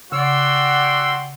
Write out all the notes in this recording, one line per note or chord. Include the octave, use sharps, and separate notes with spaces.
C#3 F#4 D5 F#5 G5 C6 E6